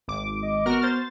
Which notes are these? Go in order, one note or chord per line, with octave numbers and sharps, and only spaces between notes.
G#1 D6
D#5
B3 F#4 A#4 F6
C5 A6